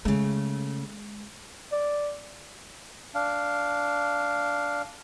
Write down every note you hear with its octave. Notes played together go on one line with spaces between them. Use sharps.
C#3 G#3 A3
D5
D4 F5